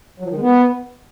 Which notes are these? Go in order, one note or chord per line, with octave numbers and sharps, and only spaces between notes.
F#3
F3
D#3
G#3
B3